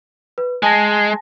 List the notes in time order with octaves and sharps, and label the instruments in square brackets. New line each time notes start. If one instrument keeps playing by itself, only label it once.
[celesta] B4
[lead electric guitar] G#3 [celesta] G#5 A5 A#6